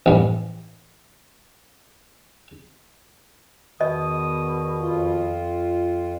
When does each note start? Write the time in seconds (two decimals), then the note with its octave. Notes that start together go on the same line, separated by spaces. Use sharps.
0.06 A1 G2
3.81 E2 B2 D#3 D#5 D#6
4.80 F2 F4